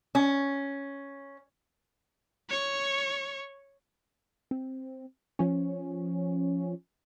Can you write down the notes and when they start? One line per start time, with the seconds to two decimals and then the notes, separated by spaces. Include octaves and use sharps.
0.15 C#4
2.50 C#5 C#6
4.51 C4
5.39 F3 C#4